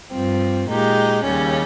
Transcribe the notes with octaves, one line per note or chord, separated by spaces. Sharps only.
G2 F3 C4
A#2 G#3 D#4 G4
D#2 C#3 G3 C#4